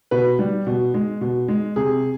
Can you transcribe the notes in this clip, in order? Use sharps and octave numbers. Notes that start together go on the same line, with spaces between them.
B2 B4
G3
B2
G#3
B2
G#3
C3 G#4